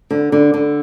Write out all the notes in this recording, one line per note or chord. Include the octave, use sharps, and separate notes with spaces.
D3
D3
D3